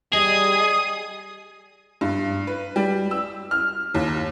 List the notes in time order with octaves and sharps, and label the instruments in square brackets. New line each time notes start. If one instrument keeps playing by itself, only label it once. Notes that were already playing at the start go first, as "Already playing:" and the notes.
[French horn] G3 [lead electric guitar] G#4 [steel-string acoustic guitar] D#5 [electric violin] D#6
[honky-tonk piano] G2
B4
G3
E6
F6
D#2